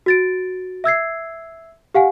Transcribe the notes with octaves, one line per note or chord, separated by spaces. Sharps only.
F#4 A6 D7
E5 E6 G#6 C7
G4 F5 F#5 G#5